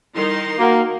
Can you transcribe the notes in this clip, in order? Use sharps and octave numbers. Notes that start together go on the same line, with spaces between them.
D#3 G3 D#4 E4 C6
A#3 F#4 A#4 F#5